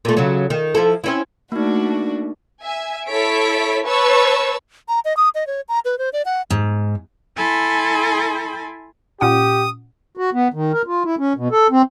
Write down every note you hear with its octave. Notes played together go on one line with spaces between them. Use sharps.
A#2 A3
C#3 F#3
D#3
F3 E4 A4
C4 C#4 E4
A3 A#3 D4 D#4 F#4
E5 G#5
E4 A4 C#5 B6 D7
B4 C#5 A5 C#6 E6
A#5
D#5
D#6
D#5
C#5
A#5
B4
C5
D5
F#5
G#2
E4 A4 G#5 B5 C6
A#2 C#4 G4 F#5 D#6
F#4
B3
D#3
A#4
F4
E4
C#4
B2
A4
C4